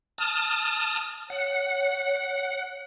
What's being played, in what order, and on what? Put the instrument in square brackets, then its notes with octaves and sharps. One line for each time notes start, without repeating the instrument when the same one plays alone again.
[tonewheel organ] A5 D#6 F6
[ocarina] C#5 [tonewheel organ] F#5